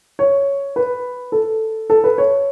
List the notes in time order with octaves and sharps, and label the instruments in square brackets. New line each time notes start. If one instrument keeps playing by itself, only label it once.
[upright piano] C#5
B4
A4
A4
B4
C#5